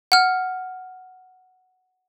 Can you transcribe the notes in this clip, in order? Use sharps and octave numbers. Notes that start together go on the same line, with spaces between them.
F#5 F6